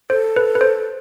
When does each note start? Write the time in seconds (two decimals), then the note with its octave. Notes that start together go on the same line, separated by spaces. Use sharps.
0.10 A4 C5
0.36 B4
0.55 B4
0.61 C5